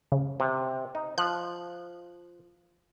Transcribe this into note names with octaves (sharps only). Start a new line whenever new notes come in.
C#3
C3
D#4
F3 F#6